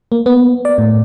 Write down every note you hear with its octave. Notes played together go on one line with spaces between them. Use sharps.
A#3
B3
D5
A2